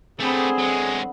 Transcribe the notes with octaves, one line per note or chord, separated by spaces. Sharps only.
D3 A3 B3 C4 G4 G#4
F#3 G#3